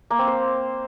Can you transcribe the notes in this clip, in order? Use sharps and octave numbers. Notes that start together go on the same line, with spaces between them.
A#3
C4
C5